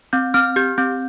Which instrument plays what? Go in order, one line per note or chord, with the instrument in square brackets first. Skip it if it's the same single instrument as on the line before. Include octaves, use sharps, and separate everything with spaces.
[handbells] C4 G6
C4 F6
G4 G6
C4 G6